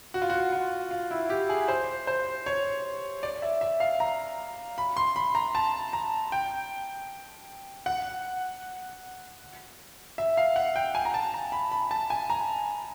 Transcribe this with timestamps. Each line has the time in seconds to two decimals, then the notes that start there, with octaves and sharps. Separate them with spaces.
0.14 F#4
0.22 F4
0.30 F#4
0.53 F4
0.91 F4
1.11 E4
1.30 G4
1.49 G#4
1.68 C5
2.07 C5
2.46 C#5
3.23 D5
3.42 E5
3.61 E5
3.80 F5
4.00 A#5
4.78 B5
4.97 C6
5.16 B5
5.35 A#5
5.55 A5
5.93 A#5
6.32 G5
7.86 F#5
10.18 E5
10.37 F5
10.56 F#5
10.76 G5
10.95 G#5
11.05 A#5
11.14 A5
11.34 A#5
11.52 B5
11.72 B5
11.91 A5
12.10 G#5
12.30 A#5